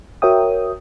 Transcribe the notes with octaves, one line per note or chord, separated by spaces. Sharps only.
F#4 A#4 C#5 E5 G5 D#6